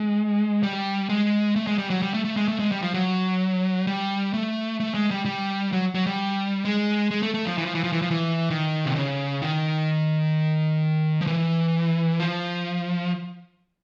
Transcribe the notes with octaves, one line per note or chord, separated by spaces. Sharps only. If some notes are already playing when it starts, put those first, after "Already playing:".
Already playing: G#3
G3
G#3
A3
G#3
G3
F#3
G3
A3
A3
G#3
A3
G#3
G3
F3
F#3
G3
A3
A3
G#3
G3
G3
F#3
F#3
G3
G#3
G#3
A3
A3
F3
E3
F3
E3
F3
E3
F3
E3
D#3
C3
C#3
D#3
F3
E3
F3